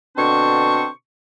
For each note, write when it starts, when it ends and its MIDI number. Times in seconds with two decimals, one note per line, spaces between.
0.17 0.88 47
0.17 0.88 50
0.17 0.88 60
0.17 0.88 62
0.17 0.88 72
0.17 0.88 85